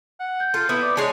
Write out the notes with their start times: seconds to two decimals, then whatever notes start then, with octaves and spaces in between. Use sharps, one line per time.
0.20 F#5
0.40 G6
0.54 F4 A4
0.69 B3 E4
0.82 D5
0.97 G#3 D4 G#4 C#5 A5